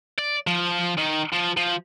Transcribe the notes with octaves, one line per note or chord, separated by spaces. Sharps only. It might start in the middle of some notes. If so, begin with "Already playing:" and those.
D5
F3
D#3
F3
F3